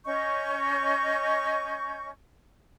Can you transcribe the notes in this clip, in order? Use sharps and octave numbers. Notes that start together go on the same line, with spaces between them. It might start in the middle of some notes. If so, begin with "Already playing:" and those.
C#4 D#5 C#6 G6